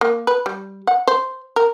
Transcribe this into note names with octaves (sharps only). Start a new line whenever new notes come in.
A#3
B4
G3
F#5
C5
A#4